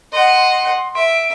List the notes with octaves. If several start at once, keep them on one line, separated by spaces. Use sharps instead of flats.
D#5 F#5 C6
E5 D7